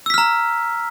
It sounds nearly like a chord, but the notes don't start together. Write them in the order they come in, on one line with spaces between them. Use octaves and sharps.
E6 B6 F6 A#5